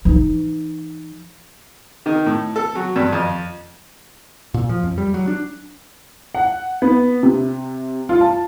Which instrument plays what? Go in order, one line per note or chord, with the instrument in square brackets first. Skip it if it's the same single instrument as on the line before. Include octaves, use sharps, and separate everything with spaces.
[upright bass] E3 D#4
[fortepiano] D#3
A2
A4
F#3
G2
F2
[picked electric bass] A#2
F3
F2
G3
F#3
D4
[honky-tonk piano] F#5
B3
C3
F4
A5